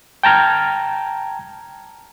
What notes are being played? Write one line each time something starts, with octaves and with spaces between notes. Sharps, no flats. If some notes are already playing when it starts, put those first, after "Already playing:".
G5 A5 A#5 F6 G#6